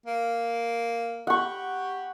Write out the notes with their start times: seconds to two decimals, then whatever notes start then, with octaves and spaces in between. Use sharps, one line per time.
0.07 A#3
1.27 G4 F#5 C#6